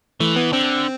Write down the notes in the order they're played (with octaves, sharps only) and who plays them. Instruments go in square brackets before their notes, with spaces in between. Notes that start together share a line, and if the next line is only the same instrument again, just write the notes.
[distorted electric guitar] E3 [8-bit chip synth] A3
[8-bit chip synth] B3
[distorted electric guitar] D3 [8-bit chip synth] C4